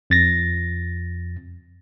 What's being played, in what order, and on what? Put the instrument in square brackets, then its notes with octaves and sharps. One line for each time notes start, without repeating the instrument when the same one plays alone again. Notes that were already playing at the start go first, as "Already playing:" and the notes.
[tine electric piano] F2 A6 A#6